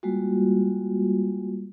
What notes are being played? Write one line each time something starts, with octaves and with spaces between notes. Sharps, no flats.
G3 G#3 A#3 F4 F#4